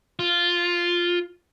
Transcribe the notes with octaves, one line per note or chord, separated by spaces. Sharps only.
F4